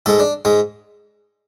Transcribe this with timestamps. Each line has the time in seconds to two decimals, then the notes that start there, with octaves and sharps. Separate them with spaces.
0.06 G#2 G#3 A4
0.20 D4
0.45 G#2 G#3